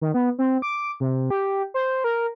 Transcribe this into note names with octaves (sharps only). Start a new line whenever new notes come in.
D#3
B3
C4
D6
C3
G4
C5
A#4